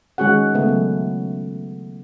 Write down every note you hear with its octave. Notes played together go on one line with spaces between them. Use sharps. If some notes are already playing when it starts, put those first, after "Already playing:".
D#3 G#3 C#4 F#4 G#4 F#5
C#3 A3 B3
F#3